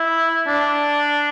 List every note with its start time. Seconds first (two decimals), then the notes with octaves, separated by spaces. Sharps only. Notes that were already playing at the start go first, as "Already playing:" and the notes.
Already playing: E4
0.48 D4